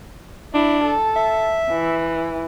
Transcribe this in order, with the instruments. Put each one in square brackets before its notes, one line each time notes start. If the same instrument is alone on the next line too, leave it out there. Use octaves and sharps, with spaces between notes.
[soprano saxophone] D4 [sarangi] E4
[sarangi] A4
[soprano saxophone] E5
[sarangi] E3